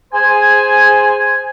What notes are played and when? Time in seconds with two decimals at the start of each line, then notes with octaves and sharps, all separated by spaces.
0.13 G#4 C5 G#5